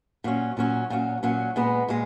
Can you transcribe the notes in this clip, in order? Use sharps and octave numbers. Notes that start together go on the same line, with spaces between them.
A#2 F#3 C#4
A#2 F#3 C#4
A#2 F#3 C#4
A#2 F#3 C#4
A#2 G#3 B3
A#2 G#3